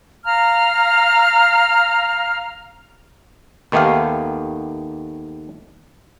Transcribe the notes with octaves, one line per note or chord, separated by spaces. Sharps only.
F5 A#5 F6
D#2 D#3 A3 B3 G4 F5